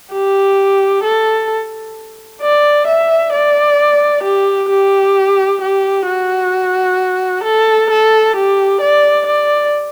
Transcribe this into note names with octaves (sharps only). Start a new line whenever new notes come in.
G4
A4
D5
E5
D5
G4
G4
G4
F#4
A4
A4
G4
D5
D5